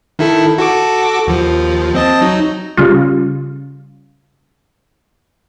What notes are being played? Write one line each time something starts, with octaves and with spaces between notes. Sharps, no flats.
D#3 E4 A4
F#4 A4 D6
D#2 F3
C4 D#5 A5
F#3 D#4
C#3 G3 F4